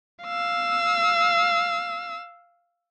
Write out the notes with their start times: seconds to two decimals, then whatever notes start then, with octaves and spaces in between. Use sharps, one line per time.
0.25 F5 E6